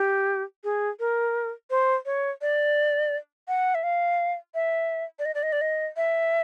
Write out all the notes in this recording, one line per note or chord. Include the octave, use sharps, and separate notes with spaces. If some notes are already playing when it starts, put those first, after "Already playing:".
Already playing: G4
G#4
A#4
C5
C#5
D5
F#5
E5
F5
E5
D5
D#5
D5
D#5
D5
D#5
E5